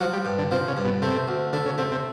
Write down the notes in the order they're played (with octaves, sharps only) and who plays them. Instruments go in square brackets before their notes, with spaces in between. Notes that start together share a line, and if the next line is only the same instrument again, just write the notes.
[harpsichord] F3 [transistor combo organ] F#3
[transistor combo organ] G3
[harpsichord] G2
[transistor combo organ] D3
[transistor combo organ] C3 [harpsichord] F3
[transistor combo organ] C#3
[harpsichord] G2
[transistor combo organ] B2
[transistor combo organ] C3 [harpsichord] A3
[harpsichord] D2
[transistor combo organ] D3 [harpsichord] A3
[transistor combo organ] C#3
[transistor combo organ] C3 [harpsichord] A3
[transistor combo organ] C3